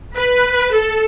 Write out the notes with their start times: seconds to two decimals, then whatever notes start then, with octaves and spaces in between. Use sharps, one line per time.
0.16 B4
0.72 A4